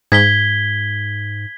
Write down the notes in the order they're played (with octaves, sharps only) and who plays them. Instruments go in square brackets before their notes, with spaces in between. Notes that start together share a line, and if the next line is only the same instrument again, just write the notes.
[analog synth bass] G#2 [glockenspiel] G#6 B6 G7